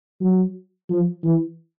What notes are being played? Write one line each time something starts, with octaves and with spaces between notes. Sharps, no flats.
F#3
F3
E3